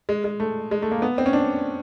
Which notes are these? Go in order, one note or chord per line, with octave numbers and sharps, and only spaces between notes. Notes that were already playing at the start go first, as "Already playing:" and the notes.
G#3
G#3
A3
G#3
A3
A#3
B3
C4
C#4
D4